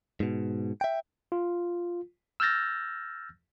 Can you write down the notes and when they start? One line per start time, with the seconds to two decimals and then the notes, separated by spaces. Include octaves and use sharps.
0.20 G#2 B2
0.81 E5 G5
1.32 F4
2.40 E6 F6 G6 A6 A#6